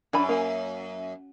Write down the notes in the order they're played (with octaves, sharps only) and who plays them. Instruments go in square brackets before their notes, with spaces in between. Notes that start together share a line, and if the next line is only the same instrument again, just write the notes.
[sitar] F#2 [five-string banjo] D4 G#5 B5
[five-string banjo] A#3 G#5